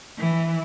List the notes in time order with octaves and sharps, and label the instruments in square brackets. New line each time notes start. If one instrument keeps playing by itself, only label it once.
[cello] E3